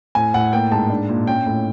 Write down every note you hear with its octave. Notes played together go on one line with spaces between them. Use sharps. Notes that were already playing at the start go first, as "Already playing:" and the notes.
A2 G#5
A2 F#5
A#3 G5
G#2 A5
D4
A#2
C#4 G5
A2